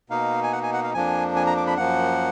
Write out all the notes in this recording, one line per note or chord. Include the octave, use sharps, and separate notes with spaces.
B2 A#3 D#4 F5
G#5
F#5
G#5
F#5
F5
F2 F3 A#3 D4 G#5
G#5
A#5
D6
B5
F#2 F3 A#3 F#5